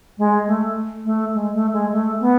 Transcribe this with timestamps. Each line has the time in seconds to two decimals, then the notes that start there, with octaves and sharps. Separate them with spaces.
0.18 G#3
0.47 A3
1.05 A3
1.34 G#3
1.53 A3
1.73 G#3
1.92 A3
2.20 B3